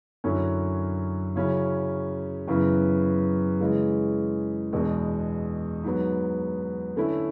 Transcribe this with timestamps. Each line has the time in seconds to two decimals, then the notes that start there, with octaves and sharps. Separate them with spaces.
0.24 F#2 D3 F#3 C#4 E4
1.36 C#3 F#3 C#4 E4
2.48 F#2 C#3 E3 B3 E4
3.60 C#3 E3 G#3
4.73 E2 B2 G#3 D4
5.84 G#2 F#3 B3
6.96 D3 A3 C#4 E4